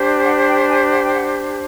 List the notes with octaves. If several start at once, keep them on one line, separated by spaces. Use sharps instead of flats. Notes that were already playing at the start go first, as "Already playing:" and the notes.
Already playing: D4 G4 C5
F#5
G5
G#5
F#5
G5
F#5